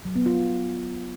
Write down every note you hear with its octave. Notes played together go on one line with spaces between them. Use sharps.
F#3
B3
F4